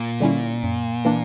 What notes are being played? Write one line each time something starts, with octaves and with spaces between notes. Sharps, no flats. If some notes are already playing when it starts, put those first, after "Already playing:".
Already playing: A#2
D3 G3 C#4 E4
F#2
E3 A#3 D4